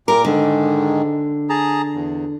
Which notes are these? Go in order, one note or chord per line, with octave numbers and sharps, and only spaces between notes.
A#2 A#4 A#5 D6
G#2 D3 D#3 G#3
G#4 A5 A#5
E2